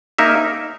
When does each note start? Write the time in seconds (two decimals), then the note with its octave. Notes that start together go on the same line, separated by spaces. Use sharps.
0.18 A#3 D#4 A#4 E5